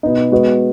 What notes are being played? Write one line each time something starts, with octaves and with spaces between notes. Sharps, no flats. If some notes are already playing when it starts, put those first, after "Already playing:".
B2 B3 D#4
G#3 B3 F#4 B4 D#5